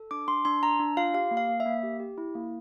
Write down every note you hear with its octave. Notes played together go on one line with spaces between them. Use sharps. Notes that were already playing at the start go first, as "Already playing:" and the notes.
Already playing: A4
D4 D6
D4 C6
D4 C6
D4 A#5
D4
F4 F5
G4 F5
A#3
F5
A#3
E5
A#3
G4
G4
E4
A#3